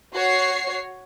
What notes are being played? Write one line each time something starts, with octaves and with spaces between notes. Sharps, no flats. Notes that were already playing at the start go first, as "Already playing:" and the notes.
F#4 C#5 C7